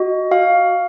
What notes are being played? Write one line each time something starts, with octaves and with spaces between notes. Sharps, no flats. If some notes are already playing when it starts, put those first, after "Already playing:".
Already playing: F#4 D#5
F#4 F5